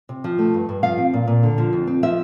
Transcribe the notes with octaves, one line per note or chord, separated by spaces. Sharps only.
C3
F3
A3
G2
G2
F3 F5
C4
A#2
A#2
D3
F3
F2
C4
F3 E5